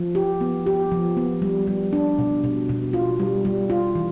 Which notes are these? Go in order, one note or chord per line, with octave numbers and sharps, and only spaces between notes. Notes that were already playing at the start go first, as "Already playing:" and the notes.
Already playing: F3
G4
B3
G4
F3
B3
G3
G3
D4
B2
B2
B2
F4
G3
G3
F4
E3